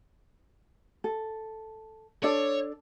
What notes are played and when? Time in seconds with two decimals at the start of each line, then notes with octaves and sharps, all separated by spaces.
1.04 A4
2.24 D4 A4 C#5 D5